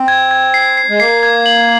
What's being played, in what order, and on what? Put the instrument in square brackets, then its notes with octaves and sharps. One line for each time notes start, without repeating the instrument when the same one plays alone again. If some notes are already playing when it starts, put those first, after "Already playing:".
Already playing: [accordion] C4
[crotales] G#6
G#6
C7
C7
[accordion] G#3
[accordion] A#3 [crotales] C7
[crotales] G#6
F#7